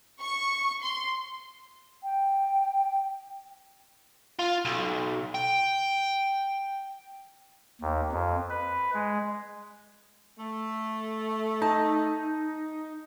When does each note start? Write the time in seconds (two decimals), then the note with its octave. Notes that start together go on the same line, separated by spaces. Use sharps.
0.20 C#6
0.83 C6
2.03 G5
4.39 F4
4.65 B1
5.35 G5
7.81 D#2
8.12 F2
8.50 B4
8.94 G#3
10.39 A3
11.62 D#4 A5